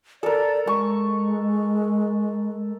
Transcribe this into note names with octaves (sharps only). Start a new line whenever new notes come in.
A4 A#4 D5
G#3 C#6